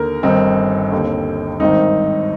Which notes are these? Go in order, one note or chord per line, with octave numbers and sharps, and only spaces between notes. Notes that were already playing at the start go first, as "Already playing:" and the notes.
Already playing: D#2 D3 A#4
G1 G2 D#3 C4 D#4
D#2 D3
G#1 G2 D#3 C4 D#4